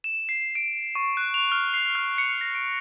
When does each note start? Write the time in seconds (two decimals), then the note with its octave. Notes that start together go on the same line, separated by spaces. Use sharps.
0.04 E7
0.29 C7
0.55 D7
0.95 C#6
1.17 F#6
1.34 F7
1.52 F6
1.74 C7
1.95 F6
2.18 C#7
2.41 A#6
2.55 D7